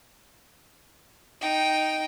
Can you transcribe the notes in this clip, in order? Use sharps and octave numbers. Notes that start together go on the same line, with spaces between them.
D#4 G5